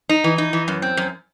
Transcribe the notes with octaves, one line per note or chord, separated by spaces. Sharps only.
D#4
E3
D#4
E3
F#2
C4
F#2